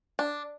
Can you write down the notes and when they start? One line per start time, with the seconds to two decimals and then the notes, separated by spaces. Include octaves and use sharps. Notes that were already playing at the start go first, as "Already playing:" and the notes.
0.19 D4